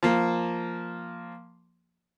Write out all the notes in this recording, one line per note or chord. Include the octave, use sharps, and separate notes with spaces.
F3 A#3